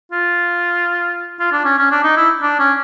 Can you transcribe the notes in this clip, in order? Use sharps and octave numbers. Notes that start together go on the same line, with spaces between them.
F4
F4
D4
C#4
C#4
D4
D#4
E4
D4
C#4